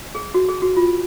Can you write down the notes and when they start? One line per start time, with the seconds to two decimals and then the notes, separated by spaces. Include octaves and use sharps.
0.15 G#4
0.34 F#4
0.49 G#4
0.62 F#4
0.76 F4